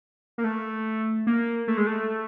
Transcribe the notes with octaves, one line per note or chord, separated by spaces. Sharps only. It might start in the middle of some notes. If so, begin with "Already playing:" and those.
A#3
A3
A#3
A3
G#3
A3